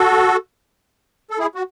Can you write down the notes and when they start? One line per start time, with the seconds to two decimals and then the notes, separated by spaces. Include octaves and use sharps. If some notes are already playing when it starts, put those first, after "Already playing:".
Already playing: F#4 A4
1.30 A4
1.39 E4 G#4
1.55 F#4